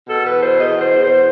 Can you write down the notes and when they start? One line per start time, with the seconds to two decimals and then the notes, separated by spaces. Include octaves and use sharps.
0.09 B2 A4
0.25 E2 B4
0.41 B2 C5
0.58 E2 D#5
0.75 B2
0.80 C5
0.91 E2
1.03 C5
1.08 B2